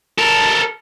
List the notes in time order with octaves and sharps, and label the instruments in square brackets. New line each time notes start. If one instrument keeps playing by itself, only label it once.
[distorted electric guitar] A4 A#4